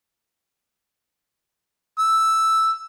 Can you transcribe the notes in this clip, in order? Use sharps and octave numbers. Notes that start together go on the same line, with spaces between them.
E6